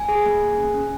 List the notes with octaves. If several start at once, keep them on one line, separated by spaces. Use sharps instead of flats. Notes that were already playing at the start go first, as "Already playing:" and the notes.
Already playing: G#5
G#4
A#3
G#4
C#4
C#4